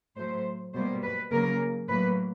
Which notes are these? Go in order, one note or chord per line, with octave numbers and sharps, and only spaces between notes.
A2 F#3 A3 C5
B2 G3 A#3 C5
B4
C#3 F#3 A#3 A#4
A2 F#3 A#3 B4